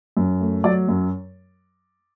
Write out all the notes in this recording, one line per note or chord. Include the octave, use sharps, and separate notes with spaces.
F#2
A3
F#3 D5
F#2